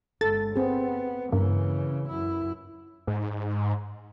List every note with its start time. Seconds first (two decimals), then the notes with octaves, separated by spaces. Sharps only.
0.21 G1 G#3 A4 A6
0.56 B3 C4 G#4
1.32 G2 C#3 E3 A#3 A#4
2.09 F#2 E4
3.07 G#2